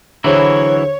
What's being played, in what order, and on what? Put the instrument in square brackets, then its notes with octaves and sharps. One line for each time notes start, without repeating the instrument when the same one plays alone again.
[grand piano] D3 G#4 C5 [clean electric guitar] E3 F#3 E4 [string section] C#5